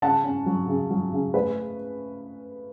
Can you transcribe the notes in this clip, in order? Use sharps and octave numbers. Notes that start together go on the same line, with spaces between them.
C#3 F#5 A5
C#4
F#3
C#3
F#3
C#3
A3 B4